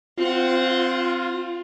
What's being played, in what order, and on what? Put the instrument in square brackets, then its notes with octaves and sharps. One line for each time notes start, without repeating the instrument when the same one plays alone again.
[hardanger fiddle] C4 F#5 [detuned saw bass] F4